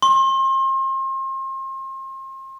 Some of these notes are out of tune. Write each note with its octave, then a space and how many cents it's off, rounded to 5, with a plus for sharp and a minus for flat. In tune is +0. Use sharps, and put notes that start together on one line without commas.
C6 +35